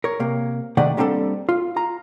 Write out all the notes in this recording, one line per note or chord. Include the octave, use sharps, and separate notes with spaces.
A#4 C#5
C3 A#3
C3 D#3 A3 D#4 D5 F#5
G3 A#3 C4 D4 D#4 A4
F4
F4 A#5